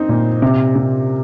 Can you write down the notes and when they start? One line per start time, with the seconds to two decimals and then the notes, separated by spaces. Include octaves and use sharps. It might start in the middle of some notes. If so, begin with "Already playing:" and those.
Already playing: C4 D#4
0.09 A#2
0.42 C3
0.76 C3